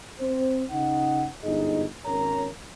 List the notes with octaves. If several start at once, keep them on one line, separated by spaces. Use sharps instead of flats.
C4 C5
C#3 D#4 F#5
G1 G#2 D#4 G#4 D#5
G#1 C#4 A#4 C#5 A#5